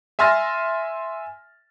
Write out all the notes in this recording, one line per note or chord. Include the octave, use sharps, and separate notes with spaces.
E5 G#5 C6 F6 A6 A#6